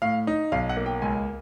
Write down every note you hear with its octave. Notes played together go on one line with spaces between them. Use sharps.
A2 F5
D#4
B1 F5
F#5
A#3
G5
C#2 G#5